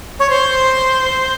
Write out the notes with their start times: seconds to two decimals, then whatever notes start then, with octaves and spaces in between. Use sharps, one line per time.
0.19 C#5
0.30 C5